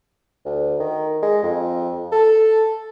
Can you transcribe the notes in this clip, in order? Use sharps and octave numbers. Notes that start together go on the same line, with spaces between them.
D2
D#3
G#3
F2
A4